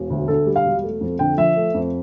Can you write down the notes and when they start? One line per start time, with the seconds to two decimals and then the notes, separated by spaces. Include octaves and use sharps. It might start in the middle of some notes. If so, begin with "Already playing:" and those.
Already playing: E1
0.10 D2
0.28 D3 A4
0.46 G3
0.56 F5
0.65 E1
0.83 A3
1.01 F2
1.19 D3 G5
1.37 F3 E5
1.56 A3
1.75 F2